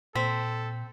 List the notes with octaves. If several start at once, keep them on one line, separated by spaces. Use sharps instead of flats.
A#2 C4 A4 B6